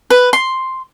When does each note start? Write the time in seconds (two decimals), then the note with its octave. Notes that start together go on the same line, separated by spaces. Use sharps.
0.10 B4
0.33 C6